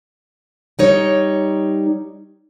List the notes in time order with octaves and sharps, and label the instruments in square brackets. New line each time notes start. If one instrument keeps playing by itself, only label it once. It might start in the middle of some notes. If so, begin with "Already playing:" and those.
[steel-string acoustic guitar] G3 D#4 C#5